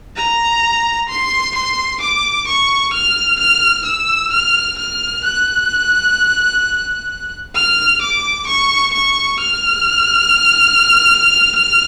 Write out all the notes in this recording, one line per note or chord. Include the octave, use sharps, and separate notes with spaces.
A#5
C6
C6
D6
C#6
F6
F6
E6
F6
F6
F#6
F6
D6
C#6
C#6
F6